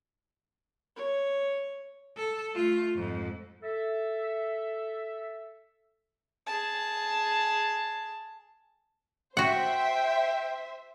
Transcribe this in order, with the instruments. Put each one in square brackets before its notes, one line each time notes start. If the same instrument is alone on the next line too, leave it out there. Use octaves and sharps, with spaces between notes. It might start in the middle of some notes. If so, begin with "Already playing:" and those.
[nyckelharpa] C#5
[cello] A4
A3 F4
F2 G#2
[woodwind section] A4 E5
[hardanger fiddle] G#4 A5
[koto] F#4 F#5 [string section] C5 E5 [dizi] G5